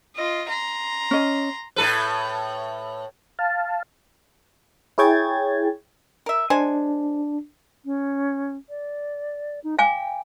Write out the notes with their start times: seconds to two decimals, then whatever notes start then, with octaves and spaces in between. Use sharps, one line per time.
0.16 F4 D#5
0.48 A#5 C6
1.11 C#4 D#5
1.76 A2 A4 B4
3.39 F5 A5
4.98 E4 G#4 C#5 G5 G#6 A6
6.26 A#4 E5
6.50 G#3 D4 C5 G#5
7.85 C#4
8.69 D5
9.64 D#4
9.79 F5 G5 G#5 D6